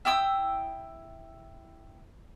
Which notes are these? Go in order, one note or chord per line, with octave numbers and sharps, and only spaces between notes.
E4 G5 D#6 E6